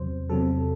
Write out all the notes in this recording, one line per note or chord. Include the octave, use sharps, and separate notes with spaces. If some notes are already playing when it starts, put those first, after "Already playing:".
Already playing: E2 C3 F#3 C5
E2 C3 F#3 A4